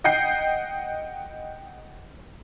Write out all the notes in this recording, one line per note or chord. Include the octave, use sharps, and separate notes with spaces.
D#5 F#5 G5 G6 C7